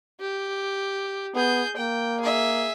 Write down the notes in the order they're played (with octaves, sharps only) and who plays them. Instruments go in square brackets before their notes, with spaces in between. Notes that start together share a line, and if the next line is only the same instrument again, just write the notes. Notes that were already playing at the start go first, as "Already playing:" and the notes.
[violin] G4
[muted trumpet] B3 [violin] G#4 G6
[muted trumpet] A#3 [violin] G5
[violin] G#4 E5